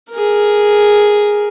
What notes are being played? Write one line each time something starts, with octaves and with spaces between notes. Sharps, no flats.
G#4 A#4